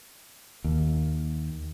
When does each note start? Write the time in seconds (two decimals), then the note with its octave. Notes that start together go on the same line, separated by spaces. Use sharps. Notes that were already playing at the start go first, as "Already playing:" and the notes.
0.64 D#2